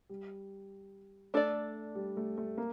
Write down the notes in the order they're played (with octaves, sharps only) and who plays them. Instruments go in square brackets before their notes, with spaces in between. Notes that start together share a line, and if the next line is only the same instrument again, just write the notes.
[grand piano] G3
[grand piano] A3 [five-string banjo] D4 A4 D5
[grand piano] G3
A3
A3
A#3